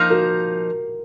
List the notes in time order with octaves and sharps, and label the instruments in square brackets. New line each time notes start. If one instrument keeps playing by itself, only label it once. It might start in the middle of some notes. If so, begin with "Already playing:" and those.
Already playing: [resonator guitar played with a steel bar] F3 A#3 D#4
[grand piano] F#4 A#4